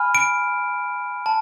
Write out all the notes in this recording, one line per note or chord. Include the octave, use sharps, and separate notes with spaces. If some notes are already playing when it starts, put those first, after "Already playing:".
Already playing: G#5 B5 F6
D7
A5